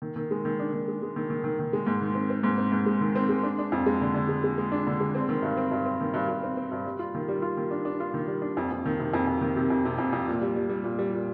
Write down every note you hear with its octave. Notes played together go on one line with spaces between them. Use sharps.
D#3
D#3
G#3
D#3
D4
D#3
G#3
G#3
D#3
D#3
D#3
D#3
G#3
G#2
D#3
C4
C4
G#2
C4
G#2
G#3
D#3
C4
G#3
D4
D4
F2
G#3
D3
D3
G#3
G#3
G#3
D4
D3
G#3
C4
D#3
G2
C4
G2
C4
D#3
G2
G2
C4
C4
G2
G3
F4
D#3
G3
F4
D#3
D4
D4
F4
D#3
G3
D4
F2
F2
D#3
C3
F2
F2
D#3
C3
F2
C3
F2
F2
A#2
G3
G3
G3
A#2
G3
A#2